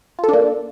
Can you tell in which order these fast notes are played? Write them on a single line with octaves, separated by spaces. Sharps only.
F4 A4 D4 A#3